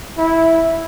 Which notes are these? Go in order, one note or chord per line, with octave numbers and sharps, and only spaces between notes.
E4